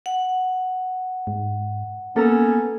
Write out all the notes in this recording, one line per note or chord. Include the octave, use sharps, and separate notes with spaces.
F#5
G#2
A#3 B3 C#4 A4 A#5 E6